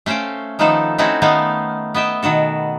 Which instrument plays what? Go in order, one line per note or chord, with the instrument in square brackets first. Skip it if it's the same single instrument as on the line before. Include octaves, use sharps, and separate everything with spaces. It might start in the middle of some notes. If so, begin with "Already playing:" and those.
[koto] A3 C#4 C5 F5 G5
D#3 F3 A3 B3 D#4 A4
A3 C4 C#4 D#4 E4 F#4
D#3 A3 B3 D#4 F5
B3 D#5 E5 G5
B2 D#3 F#4 A4